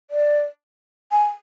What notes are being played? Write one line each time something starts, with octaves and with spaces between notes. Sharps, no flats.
D5
G#5